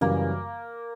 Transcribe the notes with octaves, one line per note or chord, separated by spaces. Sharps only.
F#2 C#3 E3 G3 A#3